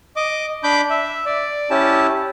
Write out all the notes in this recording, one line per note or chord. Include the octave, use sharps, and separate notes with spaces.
D#5 D6
D4 B5 D6 G6
E5
D5
C#4 E4 G4 A5